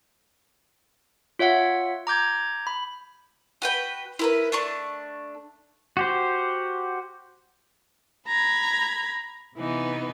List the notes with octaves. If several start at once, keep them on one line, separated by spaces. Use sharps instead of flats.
F4 C#5 E5 F#5
A#5 D6 G6 G#6
B5
F#4 B4 G5
E4 A#4 B4
A3 D4 C#6
F#4 G4 C5
A#5 B5 G#6
C3 E3 B3 D#4